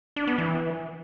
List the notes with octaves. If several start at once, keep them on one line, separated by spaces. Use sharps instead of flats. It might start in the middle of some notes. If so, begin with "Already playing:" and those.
D4
B3
E3